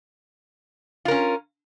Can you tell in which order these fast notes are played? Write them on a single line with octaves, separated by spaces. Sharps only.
F4 A#4 C#4